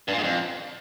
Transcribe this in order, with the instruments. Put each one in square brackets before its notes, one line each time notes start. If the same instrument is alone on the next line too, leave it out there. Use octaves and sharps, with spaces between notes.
[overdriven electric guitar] G2
A#2
G#2
F2